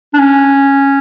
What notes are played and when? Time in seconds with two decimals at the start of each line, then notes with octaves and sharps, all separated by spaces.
0.14 D4
0.19 C#4